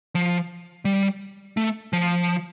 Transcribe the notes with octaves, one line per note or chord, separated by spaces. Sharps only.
F3
G3
A3
F3